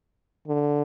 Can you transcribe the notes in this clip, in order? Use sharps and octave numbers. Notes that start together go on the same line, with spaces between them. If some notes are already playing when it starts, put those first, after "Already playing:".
D3